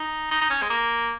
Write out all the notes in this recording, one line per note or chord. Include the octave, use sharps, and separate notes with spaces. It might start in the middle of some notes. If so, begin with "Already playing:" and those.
Already playing: D#4
D#4
D#4
C#4
G#3
A#3